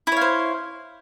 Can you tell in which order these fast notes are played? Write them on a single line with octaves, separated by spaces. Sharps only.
E4 C#5 F5 C5